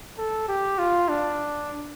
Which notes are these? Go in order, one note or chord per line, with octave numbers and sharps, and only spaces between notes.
A4
G4
F4
D4